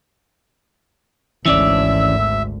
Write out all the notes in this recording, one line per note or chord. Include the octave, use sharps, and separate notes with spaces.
G#1 D2 E3 C#4 D5 E5 E6